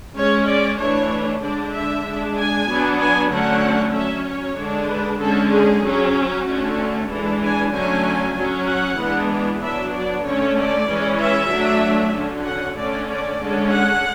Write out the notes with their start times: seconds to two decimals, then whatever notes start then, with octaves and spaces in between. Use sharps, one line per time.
0.16 G#3 C#4 C#5
0.47 D5
0.78 E3 A3 D4 C#5
1.42 D3 G#3 D4 D5
1.74 E5
2.05 G#3 D4
2.37 G#5
2.68 F#3 B3 D4
3.00 G#5
3.31 D3 F#3 A3 C#4 F#5
3.94 F#3 C#4 E5
4.25 C#5
4.57 D3 G#3 D4
4.89 B4
5.20 D3 G#3 C#4 A4
5.52 G#4
5.84 F#3 C#4
6.15 F#4
6.47 D3 A3 C#4
7.09 E3 G#3 D4 A4
7.41 G#5
7.73 D3 F#3 A3 C#4 G#5
8.36 F#3 C#4
8.67 F#5
8.98 E3 G#3 B3 D4
9.62 F#3 B3 D4 E5
9.94 D5
10.24 D3 A3 C#4 C#5
10.57 D5
10.88 E3 G#3 C#4
11.20 E5
11.51 F#3 A3 D4
12.14 D3 F#3 C#4
12.45 F#5
12.78 D3 A3 C#4 D5
13.08 D5
13.40 D3 G#3 C#4
13.73 F#5